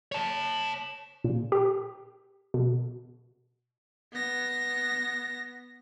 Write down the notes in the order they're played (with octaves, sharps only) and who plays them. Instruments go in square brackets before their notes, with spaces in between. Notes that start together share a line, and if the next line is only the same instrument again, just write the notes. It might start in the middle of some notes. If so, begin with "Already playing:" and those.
[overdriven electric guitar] C#5 A5
[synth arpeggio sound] A#2
G4
B2
[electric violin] B3 A#6